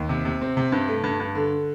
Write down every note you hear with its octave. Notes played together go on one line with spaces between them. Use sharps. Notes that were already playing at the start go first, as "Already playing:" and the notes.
Already playing: D#2
C3
C3
C4
C3
G2
A3
G2
G2
D3